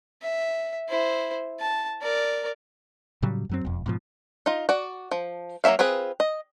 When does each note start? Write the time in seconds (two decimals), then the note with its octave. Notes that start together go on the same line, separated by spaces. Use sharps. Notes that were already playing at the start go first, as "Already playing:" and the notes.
0.22 E5
0.89 E4 C5
1.60 A5
2.02 A#4 D5
3.22 A2 C#3 F#3 G3
3.49 F#2 F#3 C4
3.65 E1 F2
3.86 G#2 B2 F3
4.46 D#4 F4
4.69 F#4 D5
5.11 F3
5.64 F#3 A#3 C#4 E5 F5
5.79 C4 F4 G#4 B4
6.20 D#5